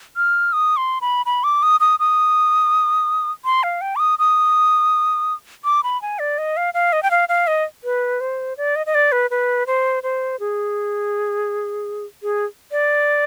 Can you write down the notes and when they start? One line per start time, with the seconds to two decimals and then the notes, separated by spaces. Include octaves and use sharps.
0.17 F6
0.53 D#6
0.77 C6
1.01 B5
1.26 B5
1.44 D6
1.63 D#6
1.80 D#6
2.00 D#6
3.45 C6
3.63 F5
3.81 G5
3.96 D6
4.00 D#6
4.19 D#6
5.64 D6
5.84 B5
6.02 G#5
6.19 D5
6.38 D#5
6.57 F5
6.74 F5
6.93 D#5
7.03 G5
7.11 F5
7.29 F5
7.47 D#5
7.84 B4
8.21 C5
8.57 D5
8.76 D#5
8.86 D#5
8.95 D5
9.12 B4
9.31 B4
9.67 C5
10.03 C5
10.40 G#4
12.23 G#4
12.72 D5